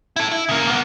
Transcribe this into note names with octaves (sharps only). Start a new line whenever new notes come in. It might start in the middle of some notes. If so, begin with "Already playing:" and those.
E4 A4
E4
C#3 A#3
A#3 B3